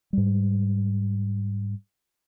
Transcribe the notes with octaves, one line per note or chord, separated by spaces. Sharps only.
G#2 G3